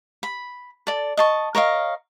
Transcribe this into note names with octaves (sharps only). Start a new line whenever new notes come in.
B5
A4 D5
D#5 A5 C#6
A#4 C#5 D#5 F5